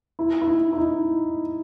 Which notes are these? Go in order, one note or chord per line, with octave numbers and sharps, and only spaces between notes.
E4
E4
D#4
E4
D#4